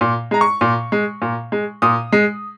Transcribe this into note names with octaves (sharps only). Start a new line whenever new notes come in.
A#2
G#3 A#5
C#6
A#2
G#3
A#2
G#3
A#2 D#6
G#3